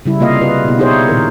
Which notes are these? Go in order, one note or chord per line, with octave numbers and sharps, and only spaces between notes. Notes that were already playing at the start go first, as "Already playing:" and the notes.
C#3 G3 E4
C3 A#3 F4 D#5 F5
E4 F4 G#4 B4
B2 B3 E4
D#4 E4 G4 G#4 C5 C#5
A#2 D#3 A#4